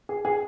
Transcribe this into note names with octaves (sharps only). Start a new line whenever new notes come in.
G#4
G#4